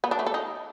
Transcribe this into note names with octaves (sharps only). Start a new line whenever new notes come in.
B3
D4
A3
A4
D#4